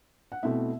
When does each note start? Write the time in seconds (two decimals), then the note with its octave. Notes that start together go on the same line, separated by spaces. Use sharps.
0.32 F#5
0.43 B2 A3 C4 E4 E5